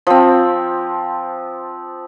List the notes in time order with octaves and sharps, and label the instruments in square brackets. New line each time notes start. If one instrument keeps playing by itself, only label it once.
[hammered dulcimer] F3 C4